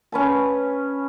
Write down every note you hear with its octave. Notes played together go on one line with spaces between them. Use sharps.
C#4 B4 A5